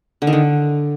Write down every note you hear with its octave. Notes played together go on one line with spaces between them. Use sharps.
D3
D#3
D3